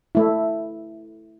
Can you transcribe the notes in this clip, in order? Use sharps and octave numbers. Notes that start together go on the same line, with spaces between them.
A3 E4